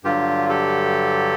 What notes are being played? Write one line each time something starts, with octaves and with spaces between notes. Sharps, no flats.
G2 D3 F#3 F4 G4
G4 A4